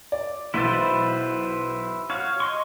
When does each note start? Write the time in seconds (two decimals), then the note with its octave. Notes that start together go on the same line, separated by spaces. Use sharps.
0.12 D5
0.54 B1 E3 E4 B4 C5 A6
2.10 F#4 C#5 F5 G#6
2.40 D#5 C6 C#6